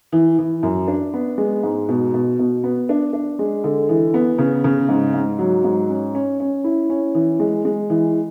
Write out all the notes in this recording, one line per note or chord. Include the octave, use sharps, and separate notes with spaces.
E3
E3
F#2
D4
B3
G#3
G#2
B2
B2
B2
B3
D4
D4
G#3
D3
E3
B3
C#3
C#3
G#2
G#2
F#3
G#2
C#4
C#4
C#4
E4
C#4
E3
G#3
G#3
E3